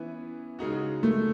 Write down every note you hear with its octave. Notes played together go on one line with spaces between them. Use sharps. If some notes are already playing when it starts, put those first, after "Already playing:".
Already playing: E3 B3 C#4 E4 B4
C#3 G#3 D#4 F#4
A3